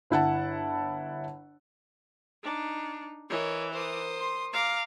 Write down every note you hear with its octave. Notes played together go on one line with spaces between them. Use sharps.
G1 E4 F#5 A5
D4 D#4
E3 A#4 C#5 D#5
A#4 C5 D#6
C6
F5 A#5 D6